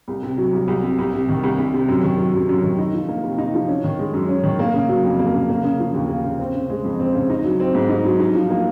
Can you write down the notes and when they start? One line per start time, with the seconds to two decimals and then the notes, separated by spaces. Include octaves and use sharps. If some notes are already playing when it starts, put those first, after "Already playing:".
0.08 C2
0.23 C3
0.38 F#3
0.53 C2
0.68 C2
0.82 C3
0.99 C2
1.13 C3
1.29 D#3
1.43 C2
1.58 C2
1.73 C3
1.88 F#2
2.03 D#3
2.18 F#3
2.33 F#2
2.49 F#2
2.63 D#3
2.78 D#4
2.93 F3
3.09 A#3
3.24 C3
3.38 D#4
3.54 F3
3.69 C#4
3.84 D#3
3.99 G#3
4.14 F#2
4.29 C#4
4.43 D#3
4.59 A#3
4.74 C#3
4.89 F#3
5.04 F2
5.19 A#3
5.34 C#3
5.49 A#3
5.63 C#3
5.79 F3
5.94 D#2
6.10 A#3
6.24 C#3
6.39 C4
6.54 C#3
6.70 G#3
6.84 F2
7.00 C4
7.15 C#3
7.30 D#4
7.44 F#3
7.60 C4
7.75 G#2
7.89 D#4
8.05 F#3
8.20 D#4
8.35 F3
8.50 A#3